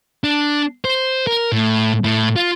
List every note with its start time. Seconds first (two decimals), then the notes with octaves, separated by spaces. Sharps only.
0.24 D4
0.85 C5
1.27 A#4
1.52 A2
2.04 A2
2.36 F4